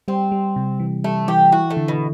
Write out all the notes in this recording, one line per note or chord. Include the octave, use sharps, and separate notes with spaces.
G3 C4
G3
C3
E3
G3 A3
E3 G4
E4 F#4
A3
D3
B2